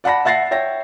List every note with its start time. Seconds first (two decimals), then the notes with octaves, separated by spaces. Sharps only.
0.04 D5 F#5 A5 B5 A#6
0.25 E5 F#5 A6 A#6 C7
0.51 C#5 E5 G5 A#6